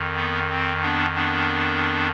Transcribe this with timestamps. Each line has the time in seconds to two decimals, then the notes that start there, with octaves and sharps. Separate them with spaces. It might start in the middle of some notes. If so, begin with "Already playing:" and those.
Already playing: F2 D#3
0.16 B3
0.50 C4
0.83 B3 D4
1.15 B3 D4